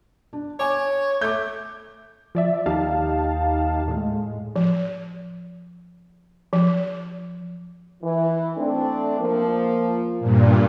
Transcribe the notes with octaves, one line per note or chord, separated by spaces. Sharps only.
D4
C#5 G#5 D6
A3 D6 G6
F3 D5 E5
D#2 D#4 G4 F5 A5
A2 G#3
F3
F3
E3
A3 C4 D4
F3 A#3
G2 A#2